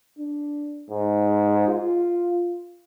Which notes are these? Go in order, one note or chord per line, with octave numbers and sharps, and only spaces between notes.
D4
G#2
F4